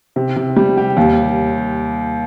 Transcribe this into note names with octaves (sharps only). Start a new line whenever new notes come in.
C3
C3
G3
G4
D#2